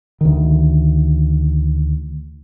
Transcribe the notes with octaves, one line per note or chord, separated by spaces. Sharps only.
D2 D#3